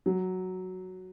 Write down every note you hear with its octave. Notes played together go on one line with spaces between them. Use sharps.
F#3